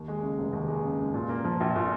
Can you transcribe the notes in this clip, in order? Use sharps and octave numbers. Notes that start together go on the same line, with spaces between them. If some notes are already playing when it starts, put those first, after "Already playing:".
Already playing: D#2
G#3
C#3
F1
D#2
G#3
C#3
F1
A#2
A#3
F3
A#1
A#2